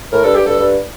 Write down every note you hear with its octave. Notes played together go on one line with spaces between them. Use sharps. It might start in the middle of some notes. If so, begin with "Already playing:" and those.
A2 A#4
G2 A4
G2 G4
G2 A4
G2